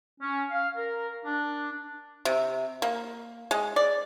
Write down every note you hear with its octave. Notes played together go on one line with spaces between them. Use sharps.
C#4
F5
A#4
D4
C3
A#3
G#3
D5